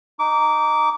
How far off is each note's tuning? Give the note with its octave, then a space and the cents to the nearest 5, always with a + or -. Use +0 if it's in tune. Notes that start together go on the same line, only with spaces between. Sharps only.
D#4 -10 D6 -20